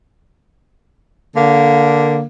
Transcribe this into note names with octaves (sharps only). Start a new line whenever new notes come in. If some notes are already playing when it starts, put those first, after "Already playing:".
D3 A#3